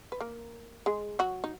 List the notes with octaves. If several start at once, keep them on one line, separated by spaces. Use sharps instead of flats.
B4
A#3 A#4
G#3 G#4
F#3 F#4
D#4